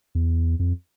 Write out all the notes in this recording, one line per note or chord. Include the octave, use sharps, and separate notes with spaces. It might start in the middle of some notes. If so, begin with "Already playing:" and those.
E2
F2